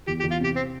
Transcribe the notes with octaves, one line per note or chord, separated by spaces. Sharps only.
E2 G4
G4
E2
F4
C3 G4
C4